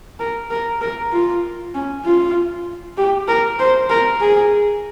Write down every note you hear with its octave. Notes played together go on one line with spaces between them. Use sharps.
A#4
A#4
A#4
F4
C#4
F4
G4
A#4
C5
A#4
G#4